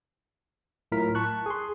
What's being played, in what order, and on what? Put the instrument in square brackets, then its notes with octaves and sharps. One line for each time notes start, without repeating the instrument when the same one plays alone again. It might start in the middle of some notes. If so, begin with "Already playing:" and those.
[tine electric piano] A2 F#3 E4 F4 A#4 B6
A5 C#6 F#6
G#4 C6